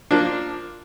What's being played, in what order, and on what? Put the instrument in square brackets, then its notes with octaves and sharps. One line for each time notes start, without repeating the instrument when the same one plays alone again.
[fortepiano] F3 A#3 D4